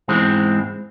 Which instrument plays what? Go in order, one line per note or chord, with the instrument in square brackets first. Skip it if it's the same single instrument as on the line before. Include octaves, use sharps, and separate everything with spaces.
[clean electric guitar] E2 G#2 E3 G#3 C4